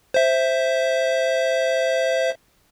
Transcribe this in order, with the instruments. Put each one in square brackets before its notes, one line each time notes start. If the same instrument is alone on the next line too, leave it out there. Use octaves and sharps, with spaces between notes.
[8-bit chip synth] C5 E5